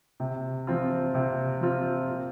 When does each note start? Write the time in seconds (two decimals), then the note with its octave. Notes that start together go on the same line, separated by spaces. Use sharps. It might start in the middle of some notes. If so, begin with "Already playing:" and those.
0.20 C3
0.67 F3 C4 F4
1.15 C3
1.61 F3 C4 F4
2.09 A#2